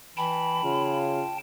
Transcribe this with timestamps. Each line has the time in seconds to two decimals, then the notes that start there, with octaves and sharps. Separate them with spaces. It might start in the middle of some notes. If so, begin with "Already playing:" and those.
0.17 E3 G5 A5 B5
0.64 C#3 F4